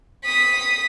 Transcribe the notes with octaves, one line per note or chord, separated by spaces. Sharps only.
D#6 B6